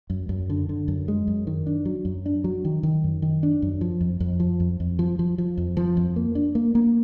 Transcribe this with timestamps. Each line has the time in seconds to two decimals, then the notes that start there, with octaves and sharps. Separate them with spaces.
0.10 F#2
0.29 F#2
0.50 D3
0.69 D3
0.88 F#2
1.08 G#3
1.27 F#2
1.47 D#3
1.66 D4
1.85 F#3
2.05 F#2
2.26 D4
2.44 F#3
2.65 D#3
2.83 D#3
3.04 F#2
3.22 D#3
3.43 D4
3.62 F#2
3.81 F3
4.01 F2
4.20 F2
4.40 F3
4.60 F2
4.80 F2
4.99 F3
5.19 F3
5.38 F3
5.57 F2
5.77 F3
5.97 F2
6.16 A#3
6.35 D4
6.55 A#3
6.75 A#3